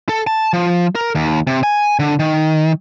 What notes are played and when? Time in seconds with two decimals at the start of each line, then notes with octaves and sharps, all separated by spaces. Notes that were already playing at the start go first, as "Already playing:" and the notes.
0.09 A4
0.27 A5
0.53 F3
0.95 A#4
1.15 D#2
1.47 C3
1.63 G#5
1.99 D3
2.19 D#3